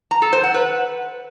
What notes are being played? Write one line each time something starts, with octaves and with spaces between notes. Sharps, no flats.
A#5
A4
C5
F#5
B4